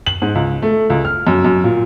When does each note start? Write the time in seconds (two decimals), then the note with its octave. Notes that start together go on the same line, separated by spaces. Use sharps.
0.07 F#7
0.22 G#2
0.35 C#2
0.62 A3
0.90 C#2
1.05 F6
1.27 F#2
1.45 F#2
1.64 A#2